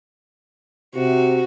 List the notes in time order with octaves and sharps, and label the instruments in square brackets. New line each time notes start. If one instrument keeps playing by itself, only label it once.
[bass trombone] C3 [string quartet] F#4